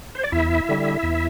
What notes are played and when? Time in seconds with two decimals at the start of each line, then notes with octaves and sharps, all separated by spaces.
0.15 C5
0.23 D5
0.32 E2 E4 E5
0.69 D3 G3
1.03 E2